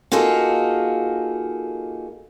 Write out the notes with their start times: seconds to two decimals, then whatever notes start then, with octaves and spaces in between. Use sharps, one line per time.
0.12 A#3 D#4 F4 F#4 G#4 A4